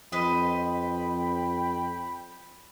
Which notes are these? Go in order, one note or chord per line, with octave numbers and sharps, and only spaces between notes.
F2 B4 C5 D#5 G5 B5